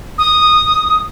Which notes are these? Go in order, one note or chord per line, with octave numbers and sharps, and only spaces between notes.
D#6